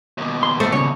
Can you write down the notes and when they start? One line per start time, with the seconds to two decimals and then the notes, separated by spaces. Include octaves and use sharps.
0.18 D#2 B2
0.43 C6
0.60 A3 C5
0.72 C#3 C#5